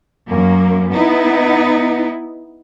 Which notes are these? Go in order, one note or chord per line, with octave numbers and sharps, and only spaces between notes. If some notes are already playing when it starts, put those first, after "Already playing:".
F#2 A#3
B3 D#4 E4